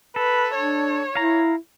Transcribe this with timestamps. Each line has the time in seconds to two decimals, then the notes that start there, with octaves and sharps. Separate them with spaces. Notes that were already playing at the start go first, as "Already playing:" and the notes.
0.16 A4 B4
0.55 D4 C#5
1.15 E4 F5 A#5